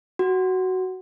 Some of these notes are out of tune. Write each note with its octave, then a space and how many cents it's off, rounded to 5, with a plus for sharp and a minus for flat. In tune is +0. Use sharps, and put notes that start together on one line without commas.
F#4 +10